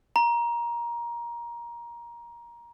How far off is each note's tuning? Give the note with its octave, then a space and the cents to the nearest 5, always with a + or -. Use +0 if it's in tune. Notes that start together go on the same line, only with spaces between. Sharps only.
A#5 +20